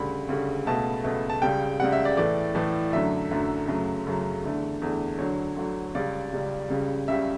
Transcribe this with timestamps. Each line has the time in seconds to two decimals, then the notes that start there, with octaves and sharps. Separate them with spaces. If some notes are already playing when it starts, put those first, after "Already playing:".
Already playing: D2 C#3 G3 B5
0.29 D2 C#3 G3
0.66 C#2 B2 A3 A5
1.04 C#2 B2 A3
1.30 A5
1.42 C#2 C#3 G3 G5
1.80 C#2 C#3 G3 F#5
1.92 E5
2.05 D5
2.17 A2 E3 A3 D5
2.55 A2 E3 A3
2.92 F#2 D3 F#3 A3 E5
3.31 F#2 D3 F#3 A3
3.68 F#2 C#3 F#3 A3
4.07 F#2 C#3 F#3 A3
4.43 E2 D3 A3
4.82 E2 D3 A3
5.19 D2 D3 F#3 C#5
5.57 D2 D3 F#3
5.95 C#2 C#3 G3 D5
6.33 C#2 C#3 G3
6.70 C#2 C#3 G3
7.08 C#2 C#3 G3 E5